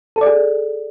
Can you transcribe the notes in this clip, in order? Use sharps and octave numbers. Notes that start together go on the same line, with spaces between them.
A4
D5
G#4